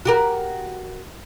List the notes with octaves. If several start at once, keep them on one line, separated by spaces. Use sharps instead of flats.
F#4 G4 A#4